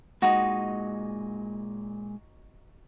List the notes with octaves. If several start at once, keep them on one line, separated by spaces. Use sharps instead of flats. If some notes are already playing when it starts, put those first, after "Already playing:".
A#2 G#3 D#4 F#4 D#5